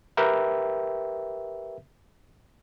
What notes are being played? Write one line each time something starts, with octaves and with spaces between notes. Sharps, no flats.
G4 A#4 B4 E5 G5